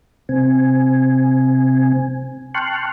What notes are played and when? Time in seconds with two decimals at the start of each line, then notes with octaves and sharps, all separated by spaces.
0.29 C3 C4 G#5
2.54 G5 A5 C6 C#6 F6 F#6